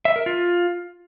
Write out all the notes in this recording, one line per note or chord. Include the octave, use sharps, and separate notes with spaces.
E5
A#4
F4